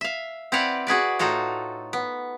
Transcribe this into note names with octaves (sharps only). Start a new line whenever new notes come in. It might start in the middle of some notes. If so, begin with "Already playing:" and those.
E5 F5
C4 E4 B4 D5 F5 F#5
F#4 G#4 B4 D5
A2 D#4 F4 F#4 A4
B3